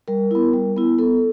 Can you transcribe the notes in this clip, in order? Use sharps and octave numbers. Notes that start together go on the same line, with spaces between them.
G3 A#4
B3 E4
G3
B3 E4
B3 A4